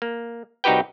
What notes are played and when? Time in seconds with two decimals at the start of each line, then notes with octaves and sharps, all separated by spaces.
0.02 A#3
0.64 C2 D#4 F#4 G4 B4 G5